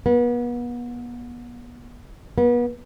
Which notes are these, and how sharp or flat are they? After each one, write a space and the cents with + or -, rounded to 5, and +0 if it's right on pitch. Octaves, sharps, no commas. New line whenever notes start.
B3 -35
B3 -35